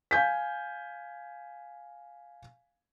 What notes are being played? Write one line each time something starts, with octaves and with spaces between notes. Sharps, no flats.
F5 G#5 G6 B6